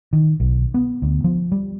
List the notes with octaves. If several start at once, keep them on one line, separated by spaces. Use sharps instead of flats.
D#3
B1
B3
D2
F3
G3